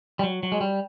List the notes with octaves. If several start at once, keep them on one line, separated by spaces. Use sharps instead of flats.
G3
F#3
F#3
G#3
G3